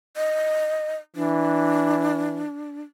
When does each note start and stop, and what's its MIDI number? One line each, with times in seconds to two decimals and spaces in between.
0.17 0.96 75
1.16 2.43 52
1.16 2.80 62